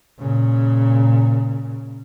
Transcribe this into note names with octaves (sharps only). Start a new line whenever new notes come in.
A#2 C#3